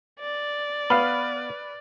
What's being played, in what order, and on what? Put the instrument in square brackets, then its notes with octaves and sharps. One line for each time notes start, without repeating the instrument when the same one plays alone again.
[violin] D5
[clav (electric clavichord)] B3 F5 [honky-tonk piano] B4 F6 F#7